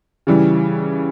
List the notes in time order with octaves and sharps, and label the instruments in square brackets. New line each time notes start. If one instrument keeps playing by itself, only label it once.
[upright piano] C#3 E3 G3